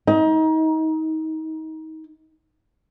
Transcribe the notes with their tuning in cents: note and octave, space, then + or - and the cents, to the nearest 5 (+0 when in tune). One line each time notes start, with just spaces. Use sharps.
D#4 +30